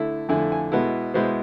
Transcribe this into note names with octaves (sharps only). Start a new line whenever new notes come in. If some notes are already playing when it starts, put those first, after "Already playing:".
Already playing: D3 A3 E4
F2 D3 A3 E4 G#5
G#5
B2 G#3 B3 E4 A4
B2 G#3 B3 E4 C5